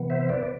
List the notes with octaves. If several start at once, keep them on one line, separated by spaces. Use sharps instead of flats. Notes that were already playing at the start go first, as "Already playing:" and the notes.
Already playing: C3 E3 B3
C5 E5
B4 D5
B4